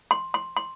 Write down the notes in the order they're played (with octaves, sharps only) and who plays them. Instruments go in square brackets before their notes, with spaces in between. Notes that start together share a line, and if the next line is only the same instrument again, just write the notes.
[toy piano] C6
C6
C6